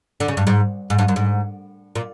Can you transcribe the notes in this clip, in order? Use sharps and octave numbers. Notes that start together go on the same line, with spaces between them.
D3
C#3
G2
G#2
G#2
G2
F#2
G#2
A#2